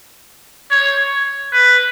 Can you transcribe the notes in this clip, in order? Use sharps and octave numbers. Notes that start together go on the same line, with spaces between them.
C#5
B4